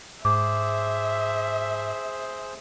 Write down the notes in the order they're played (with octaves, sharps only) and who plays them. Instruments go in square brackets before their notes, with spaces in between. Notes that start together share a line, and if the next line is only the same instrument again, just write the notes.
[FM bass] G#2 [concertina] G#4 C5 [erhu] E5 [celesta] D6